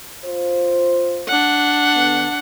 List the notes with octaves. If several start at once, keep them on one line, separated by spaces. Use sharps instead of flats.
F4 C5
D4 F#5
D3 B3